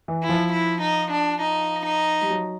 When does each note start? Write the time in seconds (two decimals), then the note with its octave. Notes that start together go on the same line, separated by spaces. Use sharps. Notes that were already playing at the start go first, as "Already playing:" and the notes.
0.08 E3
0.23 E4
0.29 F3
0.53 E4
0.81 D#4
1.11 D4
1.41 D#4
1.86 D#4
2.21 G3
2.30 F#3